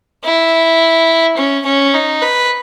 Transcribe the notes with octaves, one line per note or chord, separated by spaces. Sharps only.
E4
C#4
C#4
D#4
B4